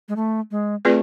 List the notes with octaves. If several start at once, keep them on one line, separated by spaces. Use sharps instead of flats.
G#3
A3
G#3
A3 C4 F4 G#4 B4 D5